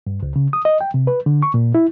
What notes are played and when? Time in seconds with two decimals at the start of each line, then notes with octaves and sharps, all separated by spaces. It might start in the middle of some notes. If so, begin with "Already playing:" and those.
0.07 G2
0.23 C#2
0.36 C#3
0.53 D#6
0.65 D#5
0.81 G5
0.94 C3
1.07 B4
1.26 D3
1.43 C#6
1.54 A#2
1.75 E4